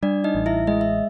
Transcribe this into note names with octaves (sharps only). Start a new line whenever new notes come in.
G3 D4 D5
D#4 D#5
A1
E4 E5
G#3 D#5
E5